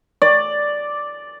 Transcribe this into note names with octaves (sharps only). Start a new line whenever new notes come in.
D5